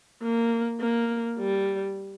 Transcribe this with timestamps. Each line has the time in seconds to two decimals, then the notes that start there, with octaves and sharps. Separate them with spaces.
0.22 A#3
0.80 A#3
1.39 G3